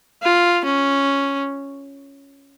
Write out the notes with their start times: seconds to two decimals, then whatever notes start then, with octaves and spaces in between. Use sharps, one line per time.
0.23 F4
0.65 C#4